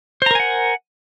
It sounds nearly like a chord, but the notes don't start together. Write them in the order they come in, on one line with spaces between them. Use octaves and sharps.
C5 A#5 A#4 G#5 F#5